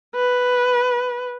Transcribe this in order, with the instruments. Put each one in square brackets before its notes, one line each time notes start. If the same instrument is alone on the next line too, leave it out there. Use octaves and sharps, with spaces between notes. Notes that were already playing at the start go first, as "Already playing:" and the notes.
[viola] B4